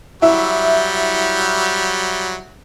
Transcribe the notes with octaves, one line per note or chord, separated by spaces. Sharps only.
F#3 G3 E4 E5